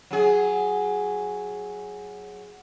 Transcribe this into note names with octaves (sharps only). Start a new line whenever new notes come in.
F#3 G#4